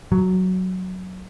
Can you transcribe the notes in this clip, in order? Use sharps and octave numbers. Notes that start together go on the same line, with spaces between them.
F#3